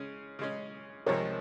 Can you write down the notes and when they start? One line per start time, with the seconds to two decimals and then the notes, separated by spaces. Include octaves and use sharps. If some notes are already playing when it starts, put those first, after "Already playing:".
Already playing: C#3 G#3 C#4
0.39 C#3 G#3 C#4
1.06 C2 C3 F3 G#3 A#4 C#5